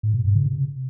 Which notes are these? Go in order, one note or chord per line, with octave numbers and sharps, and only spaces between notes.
A2
B2
G2
C#3
C3